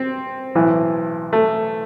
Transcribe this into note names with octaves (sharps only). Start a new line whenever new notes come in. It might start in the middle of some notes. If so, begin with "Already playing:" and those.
Already playing: C4
B1 A2 E3
A3